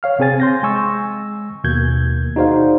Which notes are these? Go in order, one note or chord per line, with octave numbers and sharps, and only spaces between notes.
C#5 F5 F6
C3 C4 G#4 G#5 A6
C6 G6 A#6
G#3 G#5 C#6 E6
D#2 B2 A#3 G6 G#6
D#4 F#4 G#4 C5 D5 F5